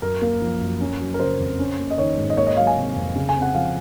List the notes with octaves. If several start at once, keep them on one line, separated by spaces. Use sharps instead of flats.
F#2 A#4
A#3
F3
F#2
C#4
F#3
A#4
C#3 C5
F2
C#4
A#3
D#5
D#3 C#5
G#2
D#5
A#3 C#5
D#5
F#3 F5
G#5
C3
F2
C#3
G#5
C4
F#5
F3 F5